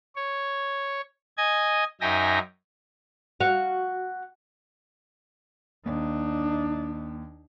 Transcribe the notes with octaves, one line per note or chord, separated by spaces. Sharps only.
C#5
D#5 G#5 G#6
F#2 D#4 E5 G5 G#5 A#6
F#4 F5
D#2 D4 D#4